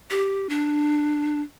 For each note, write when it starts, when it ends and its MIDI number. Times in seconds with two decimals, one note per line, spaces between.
0.11 0.49 67
0.49 1.41 62